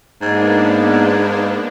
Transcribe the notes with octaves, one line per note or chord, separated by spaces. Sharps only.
G#2 A#3 B3 D4